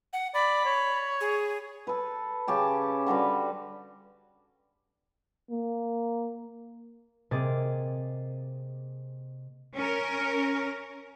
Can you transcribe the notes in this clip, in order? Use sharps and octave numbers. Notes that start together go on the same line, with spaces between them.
F#5
D5 B5
C#5
G#4
A4 B4
C#3 C#4 G4 A5
D3 G3 F#4 B4
A#3
C3 A#3 G#4 D#5 D6 A6
C#4 A#4